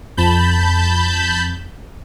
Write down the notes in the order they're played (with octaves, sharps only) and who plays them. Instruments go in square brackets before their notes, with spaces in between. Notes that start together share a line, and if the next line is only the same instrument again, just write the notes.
[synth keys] F2 [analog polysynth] A5 B5 G6